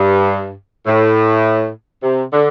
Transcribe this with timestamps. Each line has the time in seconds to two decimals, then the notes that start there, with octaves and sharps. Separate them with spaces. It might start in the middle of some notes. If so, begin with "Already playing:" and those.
Already playing: G2
0.87 A2
2.03 C3
2.32 D3